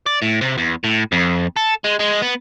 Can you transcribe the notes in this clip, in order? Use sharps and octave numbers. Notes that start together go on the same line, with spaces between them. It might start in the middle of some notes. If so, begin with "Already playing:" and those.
D5
A2
C3
E2
A2
F2
A4
G#3
G#3
B3